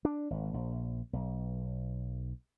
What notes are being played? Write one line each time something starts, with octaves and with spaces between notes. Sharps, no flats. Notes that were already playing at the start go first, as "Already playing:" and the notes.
D4
G#1
A#1
B1